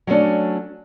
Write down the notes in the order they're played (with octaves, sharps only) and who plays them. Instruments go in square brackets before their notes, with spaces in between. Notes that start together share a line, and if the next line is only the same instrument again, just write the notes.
[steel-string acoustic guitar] F#3 G3 A3 C#4 D4